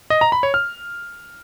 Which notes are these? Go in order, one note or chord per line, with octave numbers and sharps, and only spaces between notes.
D#5
A#5
B5
C#5
F6